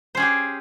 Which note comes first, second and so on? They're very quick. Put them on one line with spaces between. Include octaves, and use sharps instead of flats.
C5 C#4 G#4 G4